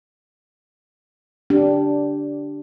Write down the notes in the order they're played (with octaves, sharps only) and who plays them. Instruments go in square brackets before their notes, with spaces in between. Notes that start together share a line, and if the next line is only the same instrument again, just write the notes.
[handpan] D4 G4